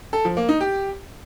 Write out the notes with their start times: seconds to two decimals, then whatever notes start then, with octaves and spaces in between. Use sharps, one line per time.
0.13 A4
0.25 F3
0.37 A#3
0.49 D#4
0.60 G4